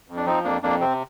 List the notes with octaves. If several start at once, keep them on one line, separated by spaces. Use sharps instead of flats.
F2
D4
F3 C4 D#4
F2 A#3 D4
F2 A#3 D4
C3 C4